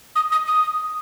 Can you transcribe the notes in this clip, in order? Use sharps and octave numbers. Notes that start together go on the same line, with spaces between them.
D#6
D#6
D#6